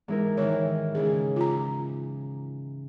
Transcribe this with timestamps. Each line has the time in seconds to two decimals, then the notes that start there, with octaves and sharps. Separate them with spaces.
0.08 G#2 E3 E4 A#4
0.37 D#3 E3 E4 C#5
0.95 G#2 C#3 E4 G#4
1.36 F4 A#5